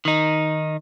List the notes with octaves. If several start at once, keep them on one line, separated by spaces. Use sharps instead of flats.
D#3 D#4